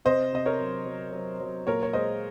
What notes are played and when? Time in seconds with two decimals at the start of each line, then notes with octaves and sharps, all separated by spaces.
0.05 C3 C5 D#5
0.33 C3 D#5
0.46 A#4 C#5
0.59 F#3
0.86 F#3
1.13 F#3
1.40 F#3
1.67 A#2 A#4 C#5
1.83 C#5
1.93 G#3 C5 D#5